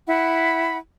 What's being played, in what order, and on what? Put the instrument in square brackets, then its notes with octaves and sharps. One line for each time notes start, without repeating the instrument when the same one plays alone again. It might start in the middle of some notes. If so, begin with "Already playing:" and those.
[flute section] E4 F#5 B5